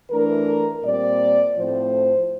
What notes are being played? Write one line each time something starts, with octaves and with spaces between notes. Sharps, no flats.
E3 A3 D4 A#4
A#2 G3 C4 D5
A2 F3 A3 C4 C5